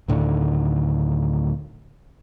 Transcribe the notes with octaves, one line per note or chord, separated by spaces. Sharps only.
D2 A2 D3 D#3